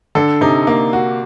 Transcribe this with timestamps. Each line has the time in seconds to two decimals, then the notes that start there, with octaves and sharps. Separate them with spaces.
0.15 D3 A4
0.41 C3 D#4
0.67 A#3
0.93 F#4